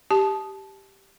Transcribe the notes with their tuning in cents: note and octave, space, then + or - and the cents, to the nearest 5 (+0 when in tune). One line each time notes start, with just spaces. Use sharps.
G4 +0 A5 -20